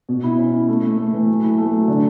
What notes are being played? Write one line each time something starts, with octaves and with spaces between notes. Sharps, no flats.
B2
E4
C#4
E4
A3
A3
A3
E3
F#3
E4
A3
F#3
D3